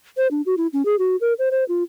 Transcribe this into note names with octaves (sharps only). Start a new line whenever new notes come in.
C5
D4
F#4
E4
C#4
G#4
F#4
A#4
C5
C5
F4